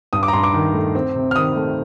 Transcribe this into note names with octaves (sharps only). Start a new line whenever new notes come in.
G2 D#6
D6
A#5
G2 C6
D6
D#3
A3
C4
C3
F6
D#3 D#6
A3